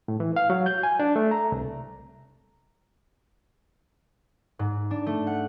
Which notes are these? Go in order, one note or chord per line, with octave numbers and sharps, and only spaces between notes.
A2
E3
F5
F#3
G6
G#5
D4
A3
A#5
C2
G#2
D4
A3
F#5